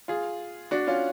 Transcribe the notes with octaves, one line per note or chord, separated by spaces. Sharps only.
F4 G#4
D4 F#4
C#4 F4